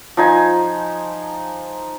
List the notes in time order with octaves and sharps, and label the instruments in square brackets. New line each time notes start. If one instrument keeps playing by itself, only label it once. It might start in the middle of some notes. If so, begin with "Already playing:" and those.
[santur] F3 D#4 G#5